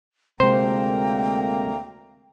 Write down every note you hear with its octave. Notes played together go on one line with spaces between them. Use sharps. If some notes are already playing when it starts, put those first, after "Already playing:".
D2 C3 G#3 A#3 C5 G5 A#5